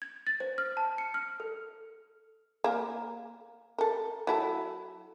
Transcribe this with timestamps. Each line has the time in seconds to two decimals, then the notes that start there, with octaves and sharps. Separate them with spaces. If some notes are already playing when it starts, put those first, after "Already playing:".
0.02 G#6
0.27 A6
0.40 C5
0.58 F6
0.77 A5
0.98 C#7
1.14 F6
1.40 A4
2.64 A#3 A#4
3.78 A4 A#4
4.27 F#3 E4 A4